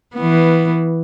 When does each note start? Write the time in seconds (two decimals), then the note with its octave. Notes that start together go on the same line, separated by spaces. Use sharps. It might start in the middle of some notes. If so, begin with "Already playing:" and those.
0.15 E3 B3